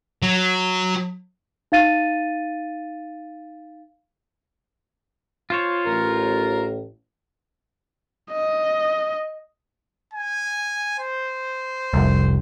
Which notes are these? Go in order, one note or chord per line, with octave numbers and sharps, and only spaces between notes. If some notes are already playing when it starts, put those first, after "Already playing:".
F#3
D#4 F5 A6 D#7
F4 C5 C#5
A1 A#4
D#5
G#5
C5
F1 C2